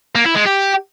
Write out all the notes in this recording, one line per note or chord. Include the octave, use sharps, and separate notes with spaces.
A#3
E4
G#3
G4